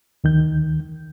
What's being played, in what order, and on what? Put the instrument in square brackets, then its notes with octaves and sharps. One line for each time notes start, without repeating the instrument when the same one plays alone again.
[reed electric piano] D2 D#3 G6